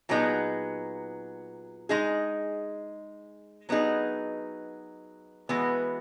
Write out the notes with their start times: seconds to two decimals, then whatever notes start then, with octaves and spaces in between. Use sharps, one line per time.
0.09 A#2 F#3 B3 D#4 G#4
1.89 G#3 D#4 G#4
3.69 F#3 B3 D#4 G#4
5.49 E3 G#3 B3 F#4